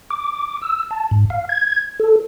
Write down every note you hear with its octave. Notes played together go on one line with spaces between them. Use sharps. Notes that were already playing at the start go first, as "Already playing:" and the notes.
D6
E6
A5
G#2
F5
G#6
A4